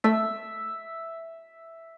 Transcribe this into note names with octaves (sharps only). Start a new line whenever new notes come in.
A3 E5